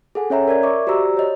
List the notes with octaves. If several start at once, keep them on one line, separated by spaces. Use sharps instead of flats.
G#4 A4 F#5 G#5
C#4 C#5 E5 A#5
A#4 D5 G#6
D#5 E5 C#6 D6
F#4 G4 C5 D5 A#5 E6
C#5 D#5